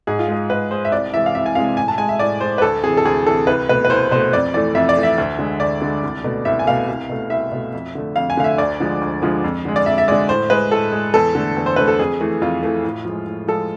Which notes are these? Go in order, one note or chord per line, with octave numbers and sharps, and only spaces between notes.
G#2 G#4
F4
G#3 G#4
G#2 B4
G#3 C5
E5
C2 D5
C3 E3 G#3 E5
F5
C2 E5
G#5
C3 E3 G#3 F5
A2 G#5
A5
G#3 G#5
E5
A2 D5
G#3 C5
B4
D2 A4
C3 E3 G#4
A4
D2 G#4
C3 E3 A4
C2 B4
B2 A3 B4
B4
C2 C5
B2 A3 C5
F2 D5
E3 A3 D5
F2 E5
D5
E3 A3
E5
D2
D3 G#3
D2 D5
D3 G#3
C2
B2 A3
C2 E5
G#5
B2 A3 F5
C2
B2 A3
C2 E5
B2 A3
F2
D3 A3
F2 F5
G#5
D3 A3 F5
E5
D2 D5
D3 F3 G#3
D2
D3 F3 G#3
F2
D3 G#3
D5
F2 E5
E5
D3 G#3 D5
A2 C5
G#3 B4
A2 A4
G#3
E2 A4
D3 A3
E2
C5
D3 A3 B4
A4
F2 G#4
E3 A3
F2 F4
E3 A3
A2
F3 G#3
A2
F3 G#3 A4